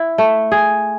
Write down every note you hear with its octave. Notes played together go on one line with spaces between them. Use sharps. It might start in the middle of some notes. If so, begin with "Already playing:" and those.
Already playing: E4
A3
G#4